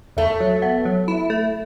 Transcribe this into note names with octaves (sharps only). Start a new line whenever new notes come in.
E2 A3
F#3
B3
F#3
E4
A3